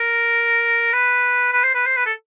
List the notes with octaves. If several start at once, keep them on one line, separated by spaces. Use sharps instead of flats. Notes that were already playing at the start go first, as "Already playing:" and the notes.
Already playing: A#4
B4
B4
C5
B4
C5
B4
A4